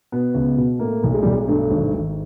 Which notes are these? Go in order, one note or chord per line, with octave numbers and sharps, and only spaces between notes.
B2 B3
C#2
B2
A2 A#3
B1
G#3
B1 G3
G#3
G2 A3
G#1
G#1